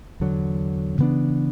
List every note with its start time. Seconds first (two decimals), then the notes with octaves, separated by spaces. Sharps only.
0.20 E2 D3 F#3
0.98 C#3 E3 B3 D4